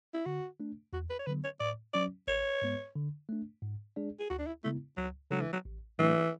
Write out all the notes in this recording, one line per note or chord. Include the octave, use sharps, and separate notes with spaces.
E4
D3 F#4
A3 D4
E2 F#4
B4
C#5
D3 F#3 B3 B4
C#5
A2 D5
F#3 C#4 D5
A1 C#5
G#2 G#3 B3
D3
A3 D4
G#2
G#3 D4 G#4 D5
G#4
D2 F#4
D4
E4
C#3 G#3 A3 B3 E4
C#2 F#3
C#3 F#3 G#3 D4 A4
E3
F#3
A1
A2 E3 F#3 A3 D4